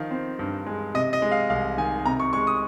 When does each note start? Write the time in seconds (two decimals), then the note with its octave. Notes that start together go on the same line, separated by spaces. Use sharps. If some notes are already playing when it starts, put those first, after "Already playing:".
Already playing: D#3 F3 F5
0.11 C4
0.39 G2
0.66 G#3
0.94 C3 D#5
1.13 D#5
1.22 G#3
1.32 F5
1.50 C2 F5
1.78 D#3 G#5
2.05 C3 A#5
2.20 C#6
2.33 G#3 C#6
2.47 D#6